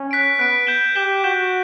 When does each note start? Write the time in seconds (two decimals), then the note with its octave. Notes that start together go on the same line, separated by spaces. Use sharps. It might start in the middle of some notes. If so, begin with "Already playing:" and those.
Already playing: C#4
0.11 F#6 B6 D7
0.39 B3 F#6 B6 D7
0.67 G6 B6 E7 G7
0.95 G4 G6 B6 E7 G7
1.24 F#4 G6 B6 E7 G7